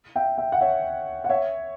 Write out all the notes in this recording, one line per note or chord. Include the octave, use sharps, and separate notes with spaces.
E5 G5
E5 G5
F#5
C#5 E5
F#5
C#5 E5